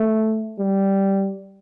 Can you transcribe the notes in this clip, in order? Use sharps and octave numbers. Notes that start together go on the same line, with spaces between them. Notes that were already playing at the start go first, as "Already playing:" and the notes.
Already playing: A3
G3